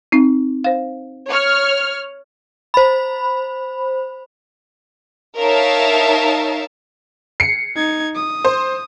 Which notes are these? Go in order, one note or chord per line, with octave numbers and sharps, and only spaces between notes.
C4 D#4
C5 F5
C#5 F6
C5 B5
D#4 A#4 C#5 E5 F5 A5
C7 C#7
D#4 G#6
D#6
C5